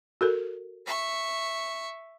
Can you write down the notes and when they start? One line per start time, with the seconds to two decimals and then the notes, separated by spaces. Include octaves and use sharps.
0.21 F#4 A4 A#4
0.86 E5 C#6